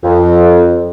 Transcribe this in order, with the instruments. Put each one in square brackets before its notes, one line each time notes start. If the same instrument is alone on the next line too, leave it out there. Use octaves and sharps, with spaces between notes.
[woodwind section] F2